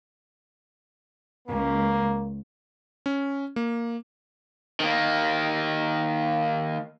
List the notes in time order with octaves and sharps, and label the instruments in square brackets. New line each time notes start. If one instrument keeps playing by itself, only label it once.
[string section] C#2 [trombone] A#3
[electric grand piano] C#4
A#3
[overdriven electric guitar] D#3 A#3